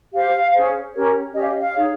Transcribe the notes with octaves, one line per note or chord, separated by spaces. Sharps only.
G4 C5 F5
C#4 G#4 C5
C#4 G4 A#4 C#5
C#4 G4 C#5 D#5
F5
D#5
F5
D#4 G#4 C#5